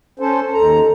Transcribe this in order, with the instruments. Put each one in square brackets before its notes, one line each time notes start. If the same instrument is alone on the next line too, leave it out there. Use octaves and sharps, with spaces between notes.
[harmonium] C#4 A4 C5
[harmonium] D#2 A#5 [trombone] A4